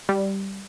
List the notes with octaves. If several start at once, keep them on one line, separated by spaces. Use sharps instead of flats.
G3